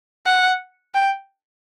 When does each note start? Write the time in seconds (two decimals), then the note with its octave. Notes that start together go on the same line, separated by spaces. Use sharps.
0.26 F#5
0.94 G5